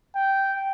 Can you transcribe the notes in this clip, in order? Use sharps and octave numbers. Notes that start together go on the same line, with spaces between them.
G5